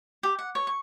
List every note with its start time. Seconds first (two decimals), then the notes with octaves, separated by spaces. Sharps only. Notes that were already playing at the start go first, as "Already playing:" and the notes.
0.23 G4
0.39 F#5
0.55 C#5
0.67 C#6